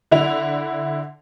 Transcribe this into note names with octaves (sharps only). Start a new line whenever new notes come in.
D3 E4 F7